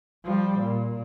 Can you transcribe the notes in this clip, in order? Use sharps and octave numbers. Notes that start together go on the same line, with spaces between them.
F3 G3
A#2